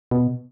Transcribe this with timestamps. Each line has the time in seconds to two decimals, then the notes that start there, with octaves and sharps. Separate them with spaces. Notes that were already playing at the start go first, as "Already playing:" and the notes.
0.11 B2